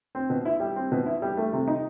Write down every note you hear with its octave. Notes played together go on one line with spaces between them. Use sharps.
C4
B2
E4
G3
C4
B2
E4
G3
A3
C3
D#4